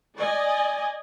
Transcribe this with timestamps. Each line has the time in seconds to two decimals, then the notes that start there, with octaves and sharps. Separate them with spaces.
0.18 D5 D#5 G#5